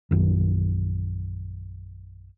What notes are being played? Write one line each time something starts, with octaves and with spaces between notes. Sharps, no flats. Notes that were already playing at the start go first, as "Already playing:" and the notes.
A#1 F#2 D#3